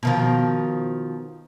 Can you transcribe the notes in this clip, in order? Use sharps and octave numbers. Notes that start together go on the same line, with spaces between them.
B2 D#3 F3